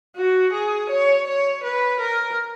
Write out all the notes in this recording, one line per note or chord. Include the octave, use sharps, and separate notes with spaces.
F#4
G#4
C#5
C#5
B4
A#4